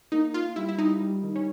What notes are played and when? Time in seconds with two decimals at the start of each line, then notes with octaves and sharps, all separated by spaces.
0.12 A#3 D#4
0.34 A#3 F4
0.56 G3 E4
0.69 E4
0.78 G3 D#4
1.00 G3
1.23 D#3
1.36 C#4